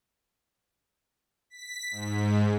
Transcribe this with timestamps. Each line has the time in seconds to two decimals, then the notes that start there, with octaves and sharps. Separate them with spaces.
1.50 B6
1.91 G#2